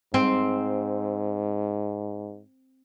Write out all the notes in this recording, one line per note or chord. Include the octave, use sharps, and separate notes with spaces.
G#2 C4